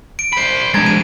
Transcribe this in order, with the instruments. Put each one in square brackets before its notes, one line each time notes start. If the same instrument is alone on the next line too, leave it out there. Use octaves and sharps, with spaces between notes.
[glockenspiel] D7
[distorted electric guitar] C5 B5
[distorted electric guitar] G#3 D4 [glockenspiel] A#5 G#6 A6
[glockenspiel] D#7